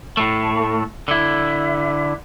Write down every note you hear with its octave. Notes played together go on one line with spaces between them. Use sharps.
A2 A3
D3 E4